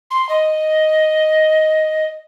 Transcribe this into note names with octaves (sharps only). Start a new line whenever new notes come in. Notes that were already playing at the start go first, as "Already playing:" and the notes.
C6
D#5